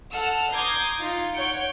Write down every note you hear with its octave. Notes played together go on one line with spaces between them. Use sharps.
A4 F#5 E6 F6
A#5 C6 D6 D#6 G6 G#6
D#4 F4
C#5 F#5 G6 C#7 D7